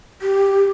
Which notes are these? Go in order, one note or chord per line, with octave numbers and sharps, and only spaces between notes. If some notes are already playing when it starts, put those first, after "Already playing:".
G4